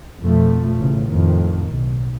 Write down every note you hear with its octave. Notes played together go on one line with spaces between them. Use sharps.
F2 B2 F3 A3
A1 C#3
F2 A2 D#3
B1